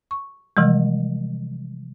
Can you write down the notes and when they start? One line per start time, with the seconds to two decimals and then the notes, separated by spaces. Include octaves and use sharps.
0.11 C#6
0.57 C3 E3 F3 G3 G#3